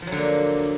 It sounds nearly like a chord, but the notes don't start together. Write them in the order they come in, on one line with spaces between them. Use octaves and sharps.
F3 F#3 D3 A#3